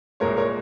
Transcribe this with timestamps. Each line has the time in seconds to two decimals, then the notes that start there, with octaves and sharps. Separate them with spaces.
0.20 C2 A#2 G#3 A#4 C#5
0.37 A#4 C#5